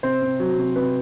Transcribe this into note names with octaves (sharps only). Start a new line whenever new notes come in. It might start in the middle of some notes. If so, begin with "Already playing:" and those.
C3 C5
C3
F#3
C3
C3 B4